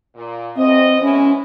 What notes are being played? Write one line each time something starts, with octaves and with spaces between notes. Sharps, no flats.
A#2
E2 C4 D#5
G#3 B3 C#4 E4